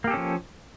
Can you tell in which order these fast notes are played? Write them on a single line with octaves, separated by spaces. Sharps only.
A#3 G4 A4 C#4 F3